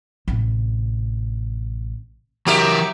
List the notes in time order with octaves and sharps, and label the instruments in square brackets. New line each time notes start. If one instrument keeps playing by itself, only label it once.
[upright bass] A1 C3
[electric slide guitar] E3 A#4 [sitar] F#3 G4 E5